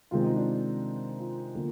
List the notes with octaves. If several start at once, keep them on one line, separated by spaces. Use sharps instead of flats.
C3 D#3 G#3 C4 F4
D#4
D4
F4
D3 F3 A#3